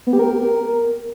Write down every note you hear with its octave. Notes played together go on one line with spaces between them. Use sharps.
B3
G4
A#4